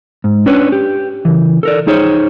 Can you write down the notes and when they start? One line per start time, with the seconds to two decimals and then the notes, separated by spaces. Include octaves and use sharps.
0.24 G#2
0.46 C#4 D4 B4 C#5
0.72 G4
1.25 C#3 E3
1.63 A4 A#4 D5
1.87 D#4 G#4 C5 C#5